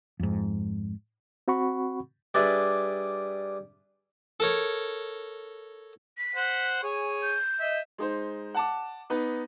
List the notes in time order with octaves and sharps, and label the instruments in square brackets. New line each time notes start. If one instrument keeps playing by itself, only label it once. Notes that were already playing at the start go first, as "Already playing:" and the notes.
[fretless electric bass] F2 G#2
[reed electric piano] C4 F#4 F#5 B5 C#6
[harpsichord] G3 D4 G#4 B4 D5 E5
A4 A#4 C#5
[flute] B6
[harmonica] C5 F#5
[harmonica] G#4 C#5 [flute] G#5
[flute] G6
[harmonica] D#5 E5
[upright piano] G#3 D#4 C5
F#5 A5 D6
B3 D#4 B4